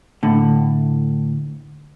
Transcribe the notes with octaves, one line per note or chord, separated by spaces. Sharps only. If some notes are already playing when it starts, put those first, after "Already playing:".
A2 D3